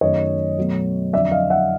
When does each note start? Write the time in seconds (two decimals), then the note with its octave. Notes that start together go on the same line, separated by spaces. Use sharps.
0.01 F#2 D#3 F#3 A3 C#5 D#5
0.57 B2 F#3 A3
1.13 F2 D3 F#3 D5 E5
1.31 D#5 F5
1.50 E5 F#5